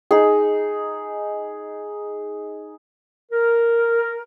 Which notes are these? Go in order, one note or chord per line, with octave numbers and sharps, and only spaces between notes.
D#4 G#4
A#4